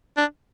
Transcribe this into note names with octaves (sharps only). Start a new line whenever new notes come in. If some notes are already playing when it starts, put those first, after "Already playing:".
D4